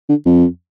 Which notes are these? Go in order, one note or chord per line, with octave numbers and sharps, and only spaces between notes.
D3
F2